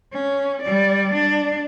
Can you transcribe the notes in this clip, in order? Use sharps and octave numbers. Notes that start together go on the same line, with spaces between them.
C#4
G3 D5
D4